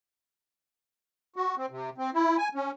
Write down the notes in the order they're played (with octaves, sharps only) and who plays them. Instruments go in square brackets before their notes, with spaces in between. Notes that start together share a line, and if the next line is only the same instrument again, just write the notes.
[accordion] F#4
C4
C3
C4
E4
G#5
C#4